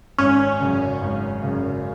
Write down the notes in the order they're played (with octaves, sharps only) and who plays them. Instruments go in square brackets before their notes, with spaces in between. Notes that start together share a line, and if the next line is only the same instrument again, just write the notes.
[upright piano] G#1 [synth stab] C#4
[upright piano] F#2 C#3
G#1
F#2 C#3